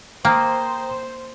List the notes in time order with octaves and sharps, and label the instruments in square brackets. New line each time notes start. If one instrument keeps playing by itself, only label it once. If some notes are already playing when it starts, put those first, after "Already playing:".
[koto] A#3 [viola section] C5 [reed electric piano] G5 A#5 D#6